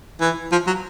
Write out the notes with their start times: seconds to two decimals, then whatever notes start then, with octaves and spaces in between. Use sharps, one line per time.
0.21 E3
0.52 F3
0.67 F#3